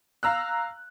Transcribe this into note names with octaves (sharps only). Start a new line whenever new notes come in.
F5 A#5 E6 F#6